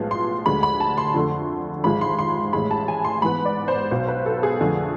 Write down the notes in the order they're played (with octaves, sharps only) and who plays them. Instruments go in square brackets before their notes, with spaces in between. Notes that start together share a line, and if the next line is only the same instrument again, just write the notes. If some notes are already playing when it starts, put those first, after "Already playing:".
Already playing: [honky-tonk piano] B1 A2 F3 G#3 B3
C6
D2 D3 G#3 B5
B5
A5
C6
F2 D3 A3
G#1 G#2 F3 G#3 B5
C6
C6
A1 A2 G#3 B5
A5
G#5
C6
G#2 E3 B3 B5
D5
C5
B1 B2 B3 C5
B4
A4
G#4
F2 D3 F3 A3